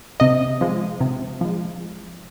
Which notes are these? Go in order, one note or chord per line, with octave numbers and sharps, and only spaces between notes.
C3 D#5
F3 G#3
C3
F3 G#3